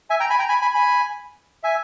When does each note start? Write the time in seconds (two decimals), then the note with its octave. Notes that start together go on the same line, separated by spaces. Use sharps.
0.10 E5 G#5
0.20 G5 A#5
0.30 G#5 B5
0.39 G5 A#5
0.48 G#5 B5
0.62 G#5 B5
0.74 G#5 B5
1.63 E5 G#5